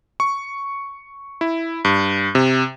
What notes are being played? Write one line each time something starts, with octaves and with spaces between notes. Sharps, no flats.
C#6
E4
G2
C3